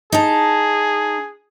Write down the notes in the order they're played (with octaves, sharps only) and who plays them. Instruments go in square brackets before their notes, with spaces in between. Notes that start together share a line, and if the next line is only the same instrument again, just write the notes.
[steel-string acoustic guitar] D#4 A5 [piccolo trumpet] G#4